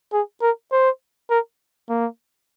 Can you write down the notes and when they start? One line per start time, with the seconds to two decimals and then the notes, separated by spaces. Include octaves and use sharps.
0.13 G#4
0.41 A#4
0.72 C5
1.30 A#4
1.89 A#3